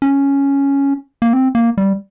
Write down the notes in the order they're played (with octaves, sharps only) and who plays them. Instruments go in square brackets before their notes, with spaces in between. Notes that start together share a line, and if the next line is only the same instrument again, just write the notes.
[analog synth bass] C#4
A#3
C4
A#3
G3